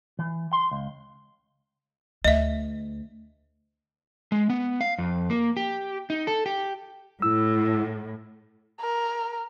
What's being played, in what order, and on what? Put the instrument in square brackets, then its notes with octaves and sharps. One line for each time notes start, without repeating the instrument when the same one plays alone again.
[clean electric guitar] E3
C6
C#2
[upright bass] D2 [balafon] D#5 E5
[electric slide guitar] G#3
B3
F5
F2
A#3
G4
D#4
A4
G4
[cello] A2 [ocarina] E4 [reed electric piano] E6
[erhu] A#4